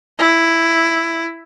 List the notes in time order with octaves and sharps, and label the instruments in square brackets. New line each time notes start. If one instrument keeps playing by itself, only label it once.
[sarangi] E4